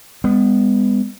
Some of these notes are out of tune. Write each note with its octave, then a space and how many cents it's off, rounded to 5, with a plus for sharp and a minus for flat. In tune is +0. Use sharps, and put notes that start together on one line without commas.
G#3 -40 B3 +20